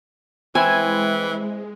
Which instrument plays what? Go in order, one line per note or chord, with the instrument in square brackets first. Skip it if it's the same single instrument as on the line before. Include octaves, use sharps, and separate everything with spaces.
[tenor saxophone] E3 [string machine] G#3 [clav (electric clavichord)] C4 E4 [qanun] G#5